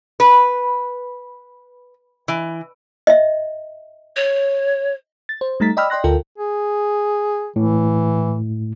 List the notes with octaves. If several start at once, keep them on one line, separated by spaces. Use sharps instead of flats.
B4
E3
D#5 E5
C#5
A6
C5
G3 A3 D#4 A#5 A6 B6
D5 D#5 G5 B5 E6 F6
D5 D#5 G5 C6 F#6 A#6
D2 F4 A4 A#4 G5
G#4
A2 E3